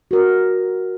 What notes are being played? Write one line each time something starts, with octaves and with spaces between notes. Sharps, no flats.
F#4 A#4